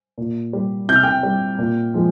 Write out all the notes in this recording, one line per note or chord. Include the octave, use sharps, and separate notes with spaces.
A#2
G3
C3 G6
F6
G5 G6
G3
A#2
F3 G#3